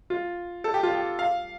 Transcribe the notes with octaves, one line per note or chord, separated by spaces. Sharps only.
F4
A4
G4
F4
G4
F5